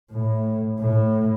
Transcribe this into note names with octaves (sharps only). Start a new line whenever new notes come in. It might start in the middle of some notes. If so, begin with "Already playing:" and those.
A2
A2